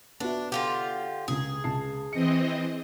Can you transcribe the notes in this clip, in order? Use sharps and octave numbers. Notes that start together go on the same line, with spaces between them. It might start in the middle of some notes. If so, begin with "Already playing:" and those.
B3 D4 F#4 E5
D3 F4 G4
C#2 C#3 G#4
C#2 A5 C7
E3 C4 D#5 C#7